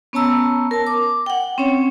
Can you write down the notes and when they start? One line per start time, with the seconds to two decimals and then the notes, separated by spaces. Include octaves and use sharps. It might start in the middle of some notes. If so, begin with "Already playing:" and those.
0.13 B3 C#4 C#5 A5 A#5 E6
0.71 A#4 A5
0.87 D6
1.26 F#5 G5
1.58 C4 C#4 C#5